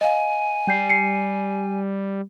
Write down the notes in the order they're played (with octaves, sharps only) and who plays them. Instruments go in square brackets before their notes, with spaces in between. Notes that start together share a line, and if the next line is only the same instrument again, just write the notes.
[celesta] D#5 F5 [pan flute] G#5
[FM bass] G3 [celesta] G5 G6 C7
[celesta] C7 C#7